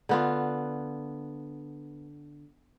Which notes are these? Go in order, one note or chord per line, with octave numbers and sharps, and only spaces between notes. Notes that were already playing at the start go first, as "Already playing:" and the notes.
D3 B3 F4